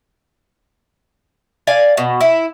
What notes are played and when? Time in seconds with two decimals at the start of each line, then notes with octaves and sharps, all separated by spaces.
1.67 D5 F5 G#5
1.97 B2
2.21 E4